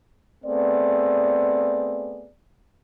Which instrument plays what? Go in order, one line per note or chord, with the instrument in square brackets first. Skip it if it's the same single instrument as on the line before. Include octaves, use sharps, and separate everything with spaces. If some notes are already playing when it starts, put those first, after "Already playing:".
[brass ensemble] A3 B3 C4 G#4 D5